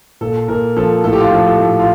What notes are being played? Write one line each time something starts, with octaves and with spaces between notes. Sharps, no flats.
A#2 A4
A#2 A#4
F3 A4
A2 A4
G4
F4
F3 G4
A4
A2
F4